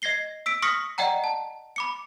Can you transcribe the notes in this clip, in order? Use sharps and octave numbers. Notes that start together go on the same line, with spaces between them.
D#5 G#6 A#6 C7 G7
E6 B6 D7
C#6 D#6 F6 A#6 B6 C#7
D5 D#5 F#5 G5 A#5
A5
B5 D6 C#7